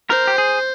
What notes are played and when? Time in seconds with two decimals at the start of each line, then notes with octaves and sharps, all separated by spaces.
0.10 A#4 C5
0.27 G4
0.38 G#4